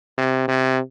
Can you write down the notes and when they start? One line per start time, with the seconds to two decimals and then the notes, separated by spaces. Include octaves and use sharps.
0.17 C3
0.48 C3